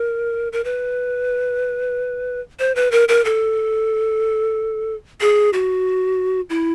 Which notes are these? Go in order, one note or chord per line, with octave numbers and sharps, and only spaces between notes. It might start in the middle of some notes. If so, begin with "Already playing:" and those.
Already playing: A#4
A#4
B4
C5
B4
A#4
A#4
A4
G#4
F#4
E4